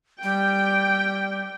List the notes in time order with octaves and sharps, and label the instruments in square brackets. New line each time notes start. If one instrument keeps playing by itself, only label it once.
[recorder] G3 [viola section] G5